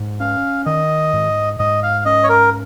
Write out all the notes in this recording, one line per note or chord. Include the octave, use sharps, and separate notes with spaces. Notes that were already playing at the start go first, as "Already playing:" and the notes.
Already playing: G#2
C#4 F5
D#3 D#5
G#2
G#2 D#5
F5
C#4 D#5
C#5
A#4